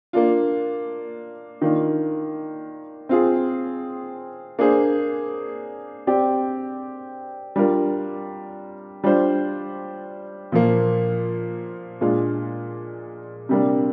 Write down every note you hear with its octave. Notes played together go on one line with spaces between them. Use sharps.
A#3 D4 F4
D#3 A#3 D4 F4
C4 F4 G#4
A#3 D4 G#4 C5
C4 G4 D5
G3 D4 F4 A#4
G3 D4 F4 C5
A#2 F3 A#3
A#2 G#3 D4 F4
C3 G3 A#3 D4